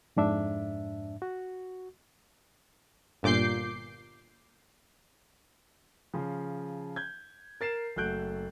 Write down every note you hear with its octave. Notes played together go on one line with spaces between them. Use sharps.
F2 G#2 D4 E5
F#4
G1 A#2 D6 G6 C7
C#3 F3
G6 G#6
A#4 A6 C7 E7
F#1 A3 F#4 F#6 G6 D7